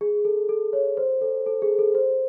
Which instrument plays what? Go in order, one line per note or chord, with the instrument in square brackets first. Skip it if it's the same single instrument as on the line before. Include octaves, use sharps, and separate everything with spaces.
[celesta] G#4
A4
A4
C#5
C5
A4
A4
G#4
A4
C5